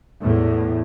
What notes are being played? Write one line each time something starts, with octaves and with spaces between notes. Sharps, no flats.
E2 A2